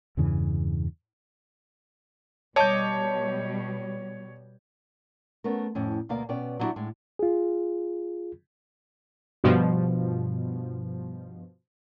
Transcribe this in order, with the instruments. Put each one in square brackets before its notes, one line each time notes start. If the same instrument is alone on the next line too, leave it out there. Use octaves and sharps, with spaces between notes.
[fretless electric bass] E2 G2 C#3 E3
[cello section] B2 G3 [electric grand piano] C#5 G6 [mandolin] D#5 A5 D6
[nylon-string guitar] A3 B3 C#4 A#4
F2 A2 C#4
D2 B2 A#3 D5 F5
B2 B3 C#4 D5 G5
F#3 G3 D4 E4 F#4 G4
A2 G#3
[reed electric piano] F4 G#4
[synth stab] G2 B2 F3